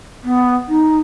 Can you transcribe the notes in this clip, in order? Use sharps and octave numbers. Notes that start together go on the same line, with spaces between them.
B3
D#4